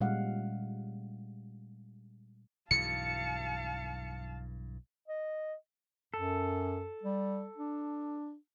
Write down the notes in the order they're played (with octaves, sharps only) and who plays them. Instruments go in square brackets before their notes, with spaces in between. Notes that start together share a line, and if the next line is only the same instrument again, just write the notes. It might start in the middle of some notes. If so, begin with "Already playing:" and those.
[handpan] A#2 G3 G#3 C#4 F5 F#5
[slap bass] B1 G2 E3 [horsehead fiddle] F5 A5 [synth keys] C#7
[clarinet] D#5
[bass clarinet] F#2 [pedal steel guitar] A4
[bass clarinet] G3
D4